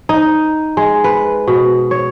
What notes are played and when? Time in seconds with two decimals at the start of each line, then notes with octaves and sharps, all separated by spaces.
0.09 D#4
0.77 G#3
1.04 B4
1.48 B2
1.91 C#5